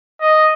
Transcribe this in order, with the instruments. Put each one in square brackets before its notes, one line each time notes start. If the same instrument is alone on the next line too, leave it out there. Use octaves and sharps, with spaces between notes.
[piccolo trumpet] D#5